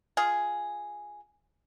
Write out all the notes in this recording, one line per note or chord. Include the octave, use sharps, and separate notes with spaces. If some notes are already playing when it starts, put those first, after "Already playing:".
F4 G#4